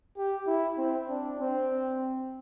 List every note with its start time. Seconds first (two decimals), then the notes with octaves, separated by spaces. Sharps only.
0.17 G4
0.47 E4
0.78 C4
1.09 D4
1.39 C4